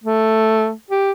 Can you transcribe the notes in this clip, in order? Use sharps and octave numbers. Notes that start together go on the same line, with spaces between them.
A3
G4